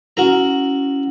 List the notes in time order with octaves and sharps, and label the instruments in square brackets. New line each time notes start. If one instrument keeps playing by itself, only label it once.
[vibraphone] C#4 E4 [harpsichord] F#4 A#4 A#5